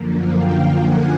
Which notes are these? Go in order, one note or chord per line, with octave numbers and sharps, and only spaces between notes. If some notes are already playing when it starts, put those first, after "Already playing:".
Already playing: F#2 D3 F3 A#3
F5 G5
F#5 G#5